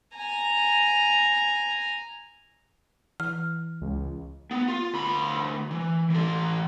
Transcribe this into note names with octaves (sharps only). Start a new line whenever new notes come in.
G#5 A#5
E3 F6
C#2
B3
F4
D2 B5
E3
E3 A4